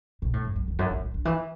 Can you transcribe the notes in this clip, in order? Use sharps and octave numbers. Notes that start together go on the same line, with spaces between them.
B2
A2
F#2
F#2
E2
F#2
A2
E3
D3
E3